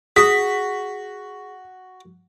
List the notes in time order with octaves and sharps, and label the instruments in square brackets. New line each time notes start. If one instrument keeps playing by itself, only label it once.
[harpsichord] F#4 [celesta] G#4 [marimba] D#6 [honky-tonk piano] B6